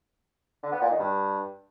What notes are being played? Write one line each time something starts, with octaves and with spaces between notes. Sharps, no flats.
D3
B3
A#2
D#3
G2